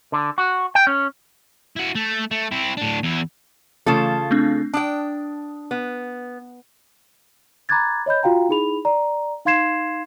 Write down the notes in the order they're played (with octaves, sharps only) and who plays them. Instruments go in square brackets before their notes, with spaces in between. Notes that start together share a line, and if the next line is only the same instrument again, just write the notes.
[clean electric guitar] D3
F#4
G5
C#4
[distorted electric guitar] E4 F#4
A3
A3
C4 E4
A2 D4
E2 E4
[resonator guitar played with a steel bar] C#3 F4 A4 [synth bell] E3 A3 E7
[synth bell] A3 C4 D4
[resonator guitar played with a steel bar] D4 G5 [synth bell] A5 D#6
[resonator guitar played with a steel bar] B3
[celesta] A#5 B5 D6 F#6 G#6 A6
C#5 D#5 B5 G6
F4 F#4 F5 G5 A#5
D#4 E4 G#4 B5 F7
D5 A#5
D#4 F5 C6 G#6 C7 E7